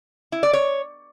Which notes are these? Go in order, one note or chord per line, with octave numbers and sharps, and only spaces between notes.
E4
D5
C#5